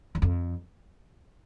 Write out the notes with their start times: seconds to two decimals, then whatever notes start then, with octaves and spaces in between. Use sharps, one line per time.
0.15 E2
0.22 F2